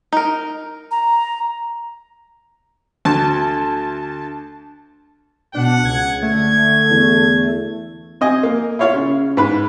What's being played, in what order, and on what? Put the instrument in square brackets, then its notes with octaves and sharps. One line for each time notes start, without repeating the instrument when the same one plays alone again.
[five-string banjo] D#4 A#4
[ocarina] A#5
[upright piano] D2 [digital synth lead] A5
[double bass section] B2 [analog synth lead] D4 [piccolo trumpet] F#5
[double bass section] C#2 [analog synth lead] G#6
[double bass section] D3 [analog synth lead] A3 [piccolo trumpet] G#6
[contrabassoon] E2
[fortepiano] C4 D#5 G#5
A#3
E4 F4 C#5 F5
C#3
G#2 B4 B5